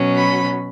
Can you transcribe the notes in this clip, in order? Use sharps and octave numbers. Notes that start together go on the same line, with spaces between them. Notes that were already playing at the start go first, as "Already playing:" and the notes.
Already playing: B2 F#3 C#4
B5